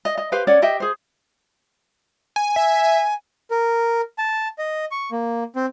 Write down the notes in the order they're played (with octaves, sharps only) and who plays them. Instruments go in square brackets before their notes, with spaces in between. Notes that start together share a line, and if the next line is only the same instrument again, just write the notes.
[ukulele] D#5
D#5
G4 B4 C5 F5
C#4 C#5 D5 F#5
G4 D#5 E5 G5
G#4 C5
[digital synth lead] G#5
[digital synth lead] E5 [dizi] G#5
[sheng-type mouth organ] A#4
A5
D#5
C#6
A#3
C4